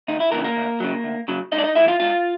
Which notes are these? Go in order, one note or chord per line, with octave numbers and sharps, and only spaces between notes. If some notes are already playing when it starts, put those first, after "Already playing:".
D2 D#4
E4
E3 A#3 A#4
C#3
A#3 A#4
D2
C#3 F#3
D2
C#3 F#3
G#2 D#4 D#5
D5
D#4 D#5
E3 A3 E4 E5
F4 F5
G#2 F4 F5